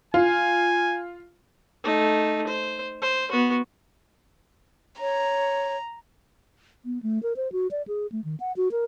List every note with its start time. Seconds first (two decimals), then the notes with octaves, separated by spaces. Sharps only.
0.14 F4 G#5
1.84 A3 D#4
2.47 C5
3.02 C5
3.31 B3 F#4
5.00 C#5 A#5
6.85 B3
7.03 A3
7.23 A#4
7.36 C5
7.52 F#4
7.71 D5
7.88 G#4
8.12 A3
8.24 D#3
8.40 F#5
8.57 F#4
8.72 A#4